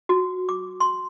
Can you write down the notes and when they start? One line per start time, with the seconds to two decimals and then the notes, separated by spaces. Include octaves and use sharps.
0.09 F#4
0.49 D6
0.80 C6